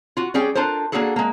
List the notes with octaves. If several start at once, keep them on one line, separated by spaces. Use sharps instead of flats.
F4 F#4
G3 C#4 G#4 D5 G5
D4 F4 A4 A#4 C5
A#3 D4 D#4 F#4 G#4 A4
G#3 A#3